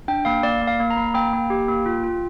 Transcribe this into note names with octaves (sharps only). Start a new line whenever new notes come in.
D4 G5
A#3 F5
A#3 D5
A#3
F5
A#3
A#5
A#3
A#3 G5
A#3
G4
A#3
F4
F4